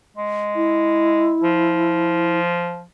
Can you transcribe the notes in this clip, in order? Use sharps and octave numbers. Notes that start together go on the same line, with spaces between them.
G#3
E4
F3